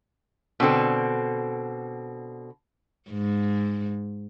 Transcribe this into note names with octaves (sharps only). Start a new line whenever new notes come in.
B2 D3 C4 A4
G#2